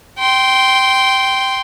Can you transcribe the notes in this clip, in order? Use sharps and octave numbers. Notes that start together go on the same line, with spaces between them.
G5 C6